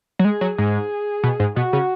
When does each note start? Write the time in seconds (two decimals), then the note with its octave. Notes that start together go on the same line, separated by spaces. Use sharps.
0.19 F#3
0.25 G#3 G#4
0.41 F#3
0.58 G#2 G#4
1.23 B2
1.40 G#2
1.56 B2 F#4
1.73 C#3